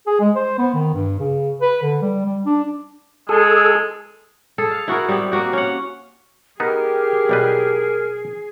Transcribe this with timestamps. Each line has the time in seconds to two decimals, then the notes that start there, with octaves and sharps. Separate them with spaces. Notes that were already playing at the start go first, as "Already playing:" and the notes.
0.07 G#4
0.20 G#3
0.35 C5
0.58 B3
0.74 D#3
0.93 G2
1.19 C#3
1.61 B4
1.82 D3
2.02 G3
2.25 G3
2.45 D4
3.29 G#3 G#4 A4
4.58 G#4 A4
4.71 F5
4.88 E4 F#4 G#4 A#4
5.08 G3 B3 C4 G4
5.32 A#3 C4 F#4 G4
5.53 C#4 F#5
6.60 B3 D#4 G4 G#4 A#4
7.29 B1 G3 B4